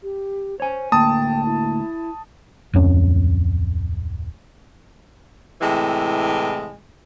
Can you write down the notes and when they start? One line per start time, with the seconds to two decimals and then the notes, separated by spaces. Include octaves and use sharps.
0.03 G4
0.60 C5 C#5 G#5
0.92 D2 A2 A#3 G5 A5 D#6
1.46 E4
2.73 D1 F2 C#4
5.60 A2 C3 E3 G#3